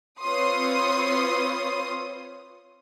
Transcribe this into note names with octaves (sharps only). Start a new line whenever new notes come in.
C4 F4 B4 C#5 C6 D#6